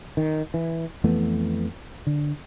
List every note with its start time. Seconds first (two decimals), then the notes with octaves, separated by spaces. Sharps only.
0.17 D#3
0.54 E3
1.04 F2 E3 A3 B3
2.07 D3